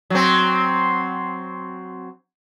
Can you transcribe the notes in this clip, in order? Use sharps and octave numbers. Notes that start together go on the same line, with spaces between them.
F#3 C4